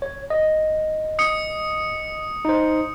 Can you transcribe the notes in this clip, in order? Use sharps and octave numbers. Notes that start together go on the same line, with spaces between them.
C#5
D#5
D#6 C#7
D#4 C5